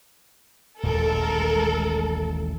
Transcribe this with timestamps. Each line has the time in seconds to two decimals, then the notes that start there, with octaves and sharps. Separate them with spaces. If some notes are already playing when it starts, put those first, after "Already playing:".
0.83 D#1 A1 D#2 G#3 A4 A#4